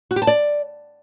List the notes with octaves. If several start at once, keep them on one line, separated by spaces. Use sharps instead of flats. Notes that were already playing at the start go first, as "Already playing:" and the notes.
F#4
G4
A5
D5